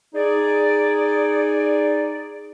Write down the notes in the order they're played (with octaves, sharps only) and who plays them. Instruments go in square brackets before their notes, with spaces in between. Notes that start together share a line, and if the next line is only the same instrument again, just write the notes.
[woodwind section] D#4 G#4 D5